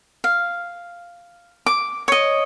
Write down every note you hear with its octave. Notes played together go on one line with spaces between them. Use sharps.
F5
D6
C#5 D#5